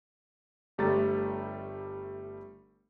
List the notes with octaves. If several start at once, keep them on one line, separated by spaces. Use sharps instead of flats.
G1 G3 A3 G4 A#5 A6